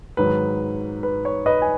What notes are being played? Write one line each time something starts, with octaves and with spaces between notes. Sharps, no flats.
G#2 D#3 F#3 B4
B4
C#5
B4 D#5
G#5